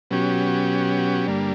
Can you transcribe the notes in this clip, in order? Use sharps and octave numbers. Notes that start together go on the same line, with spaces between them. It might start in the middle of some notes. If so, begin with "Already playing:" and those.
B2 F#3 C#4 G4
G2 D3 G3 A#3